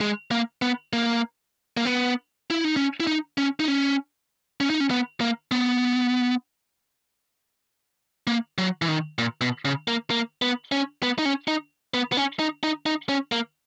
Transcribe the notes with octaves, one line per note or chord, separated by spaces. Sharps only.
G#3
A#3
B3
A#3
A#3
B3
E4
D#4
C#4
E4
D#4
C#4
D#4
C#4
C#4
D#4
C#4
B3
A#3
B3
A#3
F#3
E3
D#3
A#2
B2
C#3
A#3
A#3
B3
C#4
B3
D#4
C#4
D#4
B3
B3
C#4
D#4
D#4
D#4
C#4
A#3